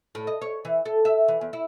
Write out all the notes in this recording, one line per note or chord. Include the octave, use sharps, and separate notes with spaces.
A2
D#5
C#5
E3
A4
E5
E3
E2
E4